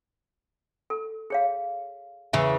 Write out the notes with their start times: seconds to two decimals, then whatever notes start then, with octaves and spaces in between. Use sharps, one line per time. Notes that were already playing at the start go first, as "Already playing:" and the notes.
0.90 A4
1.30 G#4 C#5 F5
2.33 E2 C#3 E3 E5